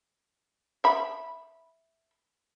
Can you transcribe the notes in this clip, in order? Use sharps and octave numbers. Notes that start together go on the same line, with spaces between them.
E5 B5